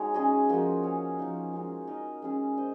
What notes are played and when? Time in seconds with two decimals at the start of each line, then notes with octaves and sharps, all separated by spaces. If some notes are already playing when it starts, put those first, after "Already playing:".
Already playing: G#3 D#4 F#4 C#5
0.14 C#4 G#4 D#5
0.49 F3 A#3 D#4 F#4
0.83 C#4 G#4 C#5
1.19 F3 A#3 D#4
1.53 G#3 C#4 F#4
1.87 D#4 A#4 D#5
2.22 G#3 C#4 G#4
2.58 C5 D#5